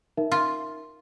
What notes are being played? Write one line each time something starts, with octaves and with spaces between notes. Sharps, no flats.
D#4 A#4 E5
F4